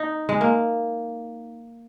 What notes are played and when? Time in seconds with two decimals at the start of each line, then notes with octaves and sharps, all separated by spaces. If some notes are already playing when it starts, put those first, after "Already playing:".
Already playing: D#4
0.29 G#3
0.41 A#3